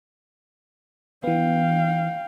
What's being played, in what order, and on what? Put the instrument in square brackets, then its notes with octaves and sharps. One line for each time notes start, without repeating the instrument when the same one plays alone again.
[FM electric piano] E3 B3 [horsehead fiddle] F5 G5